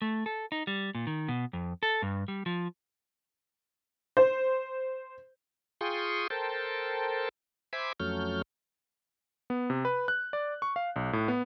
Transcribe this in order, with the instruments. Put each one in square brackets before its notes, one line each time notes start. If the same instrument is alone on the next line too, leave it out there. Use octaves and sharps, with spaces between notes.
[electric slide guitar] A3
A4
D#4
G3
A#2
D#3
B2
F2
A4
G2
G3
F3
[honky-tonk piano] C5
[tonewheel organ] F4 G#4 G5 C6 C#6 D#6
A4 A#4 C5 G5 A5
C5 E5 G#5 B5 D6
F2 F#3 A3 C#4 F6 G6
[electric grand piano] B3
C3
B4
F#6
D5
C#6
F5
B1
A2
B3